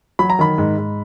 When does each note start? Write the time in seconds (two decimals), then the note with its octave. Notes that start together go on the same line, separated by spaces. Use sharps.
0.19 F#3 B5
0.30 A#5
0.39 D#3 B5
0.58 G#2
0.77 G#2